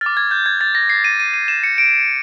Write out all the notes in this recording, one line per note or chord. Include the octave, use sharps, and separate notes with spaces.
F6 A6
D6
G#6
G6
G#6
A6
A#6
C7
D#7
D#7
D#7
E7
C#7
D7